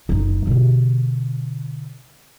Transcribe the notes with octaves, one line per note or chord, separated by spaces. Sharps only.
F#1 D#4
B2 D3